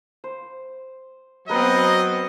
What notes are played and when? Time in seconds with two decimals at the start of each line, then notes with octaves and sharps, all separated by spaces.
0.24 C5
1.49 F#3 B3 C4 A#4 B4 D#5 B5